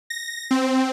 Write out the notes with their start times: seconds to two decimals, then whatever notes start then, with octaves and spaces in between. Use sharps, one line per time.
0.10 A#6
0.51 C4